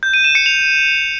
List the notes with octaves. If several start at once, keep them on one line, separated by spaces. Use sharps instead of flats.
G6
D#7
E7
C#7
F7